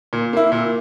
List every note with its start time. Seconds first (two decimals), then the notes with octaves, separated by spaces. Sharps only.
0.13 A#2
0.33 A#3 E4
0.52 A#2